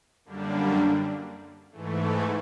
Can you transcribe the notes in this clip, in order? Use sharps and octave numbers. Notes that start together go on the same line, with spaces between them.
F#2 D3 G3 A#3 D4
G#2 E3 A3